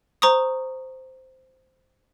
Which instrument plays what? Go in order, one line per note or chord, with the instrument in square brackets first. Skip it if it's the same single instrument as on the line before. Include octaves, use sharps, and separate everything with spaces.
[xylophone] C5 A#5 C#6 D#6